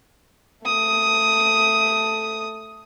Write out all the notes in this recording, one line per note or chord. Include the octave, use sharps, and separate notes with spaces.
A3 D#6